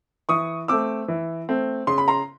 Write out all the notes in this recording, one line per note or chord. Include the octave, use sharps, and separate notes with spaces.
E3 C#6 D#6
A3 C4 D6 E6
E3
A3 C4
C#3 C6
B5
A#5 C6